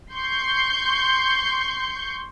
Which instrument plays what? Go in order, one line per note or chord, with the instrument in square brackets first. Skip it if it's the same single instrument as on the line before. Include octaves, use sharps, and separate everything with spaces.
[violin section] C6 C#6 G6